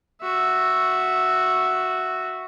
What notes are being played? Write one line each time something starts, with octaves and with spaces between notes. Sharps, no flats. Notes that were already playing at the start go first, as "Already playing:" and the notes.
F#4 E5